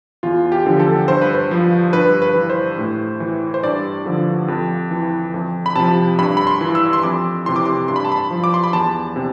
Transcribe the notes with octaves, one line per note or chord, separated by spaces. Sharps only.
E2 F4
G4
D3 F3
A4
G2 C5
B4
C5
F3
G2 B4
B4
E3
C5
A2
E3
C5
G2 D5
D3 F3
F2
E3
F2
B5
C3 F3 A5
G2 B5
B5
C6
E3
E6
C6
F2 D6
C3 E3 C6
D6
C6
G2 C6
B5
A5
B5
F3
D6
C6
B5
E2 A5
C3